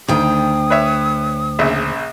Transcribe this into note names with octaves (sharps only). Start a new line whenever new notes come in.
D2 D#3 G5 D#6
B4 C#5 E5
A#1 C#3 E5